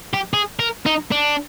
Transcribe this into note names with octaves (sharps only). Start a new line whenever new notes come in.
G4
G#4
A#4
D#4
D4